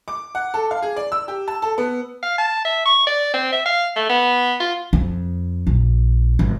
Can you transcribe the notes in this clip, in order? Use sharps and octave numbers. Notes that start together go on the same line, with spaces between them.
D6
F#5
A4
F5
G#4
D5
E6
G4
A5
A4
B3
F5
A5
E5
C#6
D5
C4
E5
F5
A3
B3
F4
F2
A#1
G#1